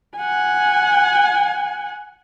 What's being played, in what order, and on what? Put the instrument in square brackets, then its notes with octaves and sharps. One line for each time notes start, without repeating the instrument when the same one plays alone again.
[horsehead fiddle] F#5 G#5